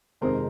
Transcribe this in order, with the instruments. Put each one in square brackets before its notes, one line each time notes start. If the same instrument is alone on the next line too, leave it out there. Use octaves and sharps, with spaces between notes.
[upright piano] F2 C3 D#3 G#3 A#4 C5